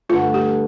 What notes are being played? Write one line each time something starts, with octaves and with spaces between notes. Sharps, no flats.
G2 D3 A3 F4
G4